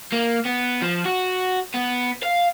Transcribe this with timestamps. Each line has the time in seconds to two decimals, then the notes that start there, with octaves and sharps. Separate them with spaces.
0.13 A#3
0.46 B3
0.82 F3
1.05 F#4
1.74 B3
2.23 F5